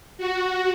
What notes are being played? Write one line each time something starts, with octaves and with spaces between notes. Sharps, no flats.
F#4